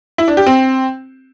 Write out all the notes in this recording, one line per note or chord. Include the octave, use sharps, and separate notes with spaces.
E4
D4
G4
C4